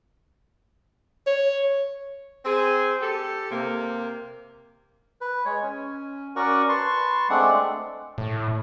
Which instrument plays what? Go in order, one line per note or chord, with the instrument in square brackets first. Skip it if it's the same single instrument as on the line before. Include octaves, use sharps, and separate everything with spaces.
[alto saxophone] C#5
[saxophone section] C4 G#4
G4 A4
C3 A#3
[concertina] B4
G#3 C#5
C#4
C#4 F#4 A#4 D5 F#5 C#6
B4 A5 C6 C#6
G#3 A3 C4 D4 D5 F#5
[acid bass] A2